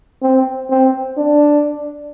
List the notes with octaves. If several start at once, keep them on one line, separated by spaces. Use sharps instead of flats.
C4
C4
D4